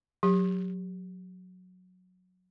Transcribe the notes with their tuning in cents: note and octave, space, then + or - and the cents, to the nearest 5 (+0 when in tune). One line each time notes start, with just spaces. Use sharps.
F#3 -15 G4 +20